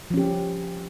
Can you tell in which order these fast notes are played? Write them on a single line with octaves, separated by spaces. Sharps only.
F3 C#4 G4